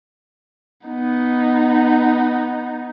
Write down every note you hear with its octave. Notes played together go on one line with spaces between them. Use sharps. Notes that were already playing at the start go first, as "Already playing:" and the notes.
B3 D#4